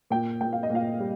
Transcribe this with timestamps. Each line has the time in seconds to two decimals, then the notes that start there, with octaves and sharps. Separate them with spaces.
0.10 A#2 G5
0.41 A#2 G5
0.53 F5
0.63 D#5
0.70 A#2
0.75 F5
1.00 G3